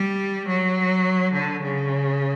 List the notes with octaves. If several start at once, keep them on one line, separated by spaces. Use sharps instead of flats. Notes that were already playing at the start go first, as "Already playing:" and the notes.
Already playing: G3
F#3
D3
C#3